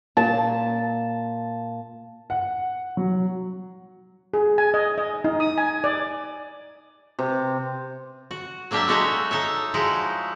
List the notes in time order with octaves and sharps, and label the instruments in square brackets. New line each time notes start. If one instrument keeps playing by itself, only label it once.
[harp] A#2 [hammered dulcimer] A5
[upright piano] F#5
F#3
[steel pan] G#4
G#5
D#5
D#5
D#4
D#6
G#5
D5
[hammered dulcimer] C3
[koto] F#4
F#3 A#3 D4 G4 E5
G#3 D#4 F#4 A4 C#5 E5
D#4 A4 C#5 E5
F3 G#3 D#4 E4 F#4